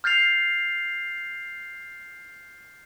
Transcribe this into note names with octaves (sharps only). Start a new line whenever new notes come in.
F6 G6 A6 C7 F7